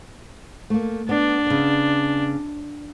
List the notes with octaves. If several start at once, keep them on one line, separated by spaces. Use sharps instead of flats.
A3 A#3
B3 D4
C#3 B3